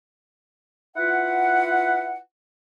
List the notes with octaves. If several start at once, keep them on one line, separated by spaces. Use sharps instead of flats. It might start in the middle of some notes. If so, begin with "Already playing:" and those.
E4 F4 B4 F#5